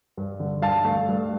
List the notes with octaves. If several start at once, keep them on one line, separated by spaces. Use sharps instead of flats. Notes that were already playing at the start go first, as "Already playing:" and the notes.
G2
D3
G2 F5 A5
A3
G2